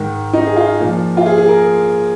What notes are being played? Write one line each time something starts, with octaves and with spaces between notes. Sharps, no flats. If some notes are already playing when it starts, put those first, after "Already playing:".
Already playing: G#2 D#3
D#4
G#4
F4
A#2 F3
F4
G#4
G#4
A#4